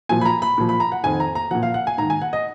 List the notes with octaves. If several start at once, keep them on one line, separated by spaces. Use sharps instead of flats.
A#2 F3 G#5
B5
A#5
B5
A#2 F3
B5
A#5
F#5
F2 D#3 G#5
A#5
A#5
A#2 F3 F#5
F5
F#5
G#5
G#2 D#3 A#5
G#5
F#5
D#5